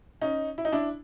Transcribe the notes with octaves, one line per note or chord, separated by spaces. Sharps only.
C#4 D#4
E4
D#4
D4 E4